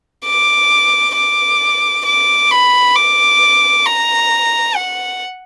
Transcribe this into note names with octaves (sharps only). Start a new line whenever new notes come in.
D6
D6
D6
B5
D6
A#5
F#5